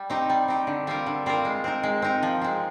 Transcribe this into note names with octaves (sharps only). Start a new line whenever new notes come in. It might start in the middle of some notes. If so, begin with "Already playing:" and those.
Already playing: G3
C4 D#4 G4
G3
C4 D#4 G4
D3
G3 C4 F4 A#4
D3
G3 C4 F4 A#4
G#3
C4 D#4 A#4
G#3
C4 D#4 A#4
F3
G#3 C4